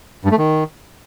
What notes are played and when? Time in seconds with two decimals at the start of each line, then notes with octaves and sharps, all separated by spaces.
0.25 G2
0.31 A3
0.38 D#3